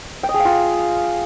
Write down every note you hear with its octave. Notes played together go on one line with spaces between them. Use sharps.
G5
D#5
G#4
F5
F4